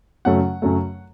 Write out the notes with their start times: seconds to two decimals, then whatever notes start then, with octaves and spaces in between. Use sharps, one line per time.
0.25 F#2 C#3 F#3 A3 F#5
0.62 F#2 C#3 F#3 A3